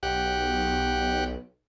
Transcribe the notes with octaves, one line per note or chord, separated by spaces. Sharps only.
B1 G4 F#5